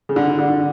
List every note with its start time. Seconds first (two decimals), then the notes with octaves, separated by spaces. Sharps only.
0.09 C#3
0.16 D3
0.39 D3